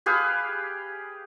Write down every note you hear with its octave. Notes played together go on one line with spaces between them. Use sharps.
G4 G#4 B4 F5